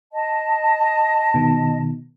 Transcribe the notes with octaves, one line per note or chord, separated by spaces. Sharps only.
D#5 A5
B2 D#3